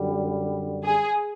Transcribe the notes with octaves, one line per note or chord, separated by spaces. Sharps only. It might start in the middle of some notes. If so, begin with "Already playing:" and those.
Already playing: F#2 D3 G3
G#4